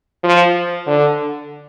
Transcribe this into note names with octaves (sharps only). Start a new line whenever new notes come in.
F3
D3